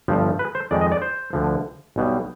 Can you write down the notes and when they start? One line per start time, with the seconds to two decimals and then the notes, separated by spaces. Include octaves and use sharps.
0.08 G1 G2 F3
0.39 B4
0.55 C5
0.71 F2 D#3 G#3 D5
0.81 D#5
0.92 D5
1.02 C5
1.33 D2 D3 F3
1.96 B1 B2 G3